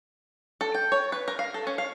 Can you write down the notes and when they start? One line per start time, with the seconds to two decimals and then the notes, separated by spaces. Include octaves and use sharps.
0.61 A4
0.75 G5
0.92 C#5
1.12 B4
1.28 A#4
1.39 F5
1.54 A4
1.67 C#4
1.78 F5